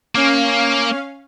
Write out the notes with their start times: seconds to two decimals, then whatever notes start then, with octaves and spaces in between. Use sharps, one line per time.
0.15 A#3 C#4 F5